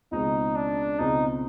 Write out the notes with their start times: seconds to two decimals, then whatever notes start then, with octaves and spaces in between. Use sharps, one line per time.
0.12 C#2 B2 G#3 C4 D#4
0.56 D4
0.99 C#2 B2 G#3 C4 D#4